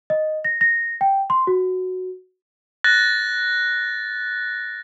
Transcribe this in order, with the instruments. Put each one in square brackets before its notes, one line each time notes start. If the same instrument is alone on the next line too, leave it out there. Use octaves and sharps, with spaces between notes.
[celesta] D#5
A#6
A#6
G5
C6
F#4
[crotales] F#6 A6 A#6